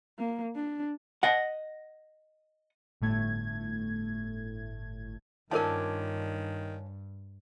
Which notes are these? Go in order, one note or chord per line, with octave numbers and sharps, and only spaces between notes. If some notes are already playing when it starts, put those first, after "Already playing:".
A#3
D4
D#5 F#5
G1 A2 A3 G#6
G2 D#3 C#4 D4 F4 A#4 C5 A5